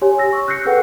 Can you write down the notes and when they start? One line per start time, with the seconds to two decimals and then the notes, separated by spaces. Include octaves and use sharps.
0.02 G4 C#5 G#5
0.18 E6 A#6
0.33 C#6
0.47 E6 F#6 G6 A#6 C7 C#7
0.65 G#4 A4 B4 F#5 G5